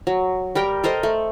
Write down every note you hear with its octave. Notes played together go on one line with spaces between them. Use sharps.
F#3
G3 A#4 G5
A4 A#4 C5 D#5
A3